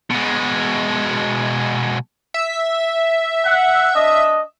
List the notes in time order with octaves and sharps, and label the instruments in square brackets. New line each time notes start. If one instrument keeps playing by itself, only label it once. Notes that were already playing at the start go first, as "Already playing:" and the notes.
[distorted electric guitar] B2 G#3
[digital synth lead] E5
[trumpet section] F#5
D4 D#5